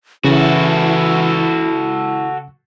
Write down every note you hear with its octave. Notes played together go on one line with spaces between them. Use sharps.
C#3 E3 E4 F#4 A4